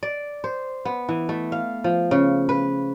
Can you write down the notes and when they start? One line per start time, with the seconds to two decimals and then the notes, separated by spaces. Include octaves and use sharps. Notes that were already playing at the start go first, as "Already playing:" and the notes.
0.03 D5
0.44 C5
0.85 B3
1.09 E3
1.29 A3
1.52 F5
1.84 F3
2.11 C#3
2.49 B4